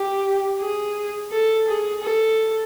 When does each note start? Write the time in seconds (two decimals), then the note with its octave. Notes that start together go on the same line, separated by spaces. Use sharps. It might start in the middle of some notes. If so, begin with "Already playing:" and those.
Already playing: G4
0.60 G#4
1.31 A4
1.67 G#4
2.03 A4